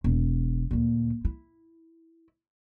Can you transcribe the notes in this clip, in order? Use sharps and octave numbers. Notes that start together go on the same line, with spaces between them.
E1
D2 A#2
E4